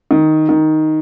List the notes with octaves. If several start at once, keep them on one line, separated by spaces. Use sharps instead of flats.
D#3
D#3